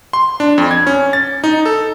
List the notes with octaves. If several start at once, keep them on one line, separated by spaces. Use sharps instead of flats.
C6
D4
F2
G#6
C#4
A6
D#4
A4